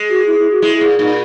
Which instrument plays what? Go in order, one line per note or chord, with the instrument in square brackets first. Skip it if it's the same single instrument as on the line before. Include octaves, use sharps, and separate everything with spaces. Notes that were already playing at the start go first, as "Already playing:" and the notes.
Already playing: [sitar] G#3
[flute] F#4
E4
E4
F#4
[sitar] G#3 [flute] E4
[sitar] A#2
[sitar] A#2 [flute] D#4